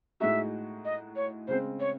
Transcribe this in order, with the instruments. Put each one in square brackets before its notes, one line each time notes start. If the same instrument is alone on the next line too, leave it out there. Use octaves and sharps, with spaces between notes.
[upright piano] A2 G#3 D#4 F#4 [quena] E5
[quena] D#5
C#5
[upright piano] C#3 G#3 C4 [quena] C5
[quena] C#5